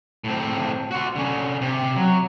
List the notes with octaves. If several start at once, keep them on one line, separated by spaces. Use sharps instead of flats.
A2 C4
F#4 C6
D3 C#4
C3 G4
F#3